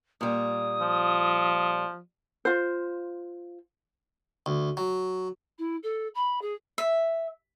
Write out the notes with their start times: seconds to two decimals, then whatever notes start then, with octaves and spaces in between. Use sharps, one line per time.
0.21 A#2 G3 D#6
0.81 F3
2.45 F4 C5
4.46 D2
4.77 F#3
5.58 E4
5.83 A4
6.14 B5
6.41 G#4
6.78 E5